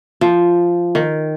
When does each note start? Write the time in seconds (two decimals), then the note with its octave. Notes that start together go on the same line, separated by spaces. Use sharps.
0.21 F3
0.95 D#3